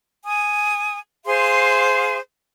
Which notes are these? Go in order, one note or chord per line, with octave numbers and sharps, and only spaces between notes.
G#5 D#6
G#4 C5 F5 C6